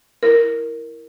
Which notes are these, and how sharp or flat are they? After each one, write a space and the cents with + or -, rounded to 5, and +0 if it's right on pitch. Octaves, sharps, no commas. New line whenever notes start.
E4 +0 A#4 +0